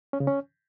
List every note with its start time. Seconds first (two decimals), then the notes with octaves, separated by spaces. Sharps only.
0.13 C#4
0.20 C#3
0.27 C#4